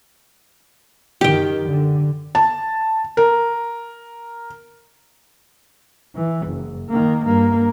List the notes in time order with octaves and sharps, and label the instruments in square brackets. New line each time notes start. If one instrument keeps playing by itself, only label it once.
[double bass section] F#2 D#3 [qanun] G4 G5
[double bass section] D3
[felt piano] A5
A#4
[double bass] E3
F#1
D#3 A#3
G2 A#3